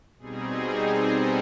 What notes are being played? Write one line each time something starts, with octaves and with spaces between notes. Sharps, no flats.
B2 G3 C4 D#4 G#4
A4